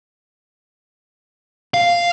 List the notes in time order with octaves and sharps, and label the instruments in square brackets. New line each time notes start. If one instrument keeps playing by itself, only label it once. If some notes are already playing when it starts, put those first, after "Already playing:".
[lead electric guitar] F5